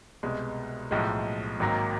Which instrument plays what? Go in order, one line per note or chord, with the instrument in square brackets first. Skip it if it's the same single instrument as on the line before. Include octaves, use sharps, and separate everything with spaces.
[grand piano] C2 B2 G#3
B1 A2 F3 G#3
G#1 G#2 D#3 F#3 A#3